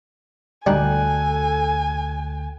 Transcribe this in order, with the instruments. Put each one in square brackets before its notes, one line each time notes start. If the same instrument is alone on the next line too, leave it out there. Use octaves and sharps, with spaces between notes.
[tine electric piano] D2 G5 F#6 [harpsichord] G3 D4 D#4 [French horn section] A4 [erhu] G#5